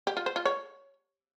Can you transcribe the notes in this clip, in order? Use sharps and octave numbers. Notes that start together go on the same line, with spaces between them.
G4
F4
C5
F4
C#5